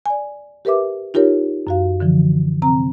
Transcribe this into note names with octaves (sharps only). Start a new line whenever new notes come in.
D5 G#5
G4 A#4 B4 E5 D6
D#4 F4 G4 A#4 C#5
F#2 F#4 F5
D3 E3 F3
C3 C4 A#5